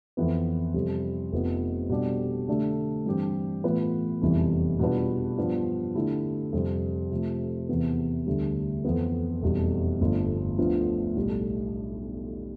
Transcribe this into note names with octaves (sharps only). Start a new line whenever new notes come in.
F2 E3 B3
F2 C3 G3
F1 F2 C3 F3 B3
B2 G3 D4 G4 D5
D3 A3 D4 G4
G2 E3 G3 C4 G4
A2 E3 B3 F4 B4
F1 E2 C3 E3 G3
B2 G3 D4 F4 B4
G2 F3 B3 D4 F4
D3 A3 E4 G4
F2 C3 G3
C3 F3 A3
E2 C3 E3 B3
D2 D3 G3
F2 E3 B3
F1 E2 B2 G3
G1 G2 F3 A3
D2 D3 F3 B3 F4
B1 A2 G3